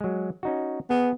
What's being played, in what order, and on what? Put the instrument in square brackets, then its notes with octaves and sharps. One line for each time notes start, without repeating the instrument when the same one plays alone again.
[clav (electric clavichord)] F#3 G#3
C#4 D#4 F#4
[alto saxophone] B3 [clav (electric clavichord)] G#4